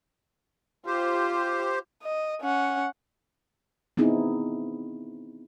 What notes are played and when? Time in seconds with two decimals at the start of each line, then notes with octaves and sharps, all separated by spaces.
0.87 F4 G4 C5
2.02 D#5
2.41 C#4 F#5
3.97 B3 C4 D#4 E4 G#4